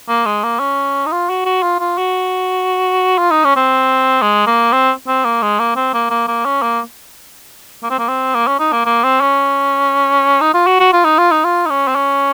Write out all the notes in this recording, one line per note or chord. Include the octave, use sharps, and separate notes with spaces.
A#3
G#3
A#3
C#4
D#4
F4
F#4
F#4
F4
F4
F#4
F4
D#4
C#4
C4
G#3
A#3
C4
C4
A#3
G#3
A#3
C4
A#3
A#3
A#3
C#4
A#3
A#3
C4
A#3
C4
A#3
C#4
D#4
A#3
A#3
C4
C#4
D#4
F4
F#4
F#4
F4
D#4
F4
D#4
F4
D#4
C#4
C4
C#4